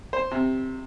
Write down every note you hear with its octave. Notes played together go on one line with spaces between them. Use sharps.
C5
C3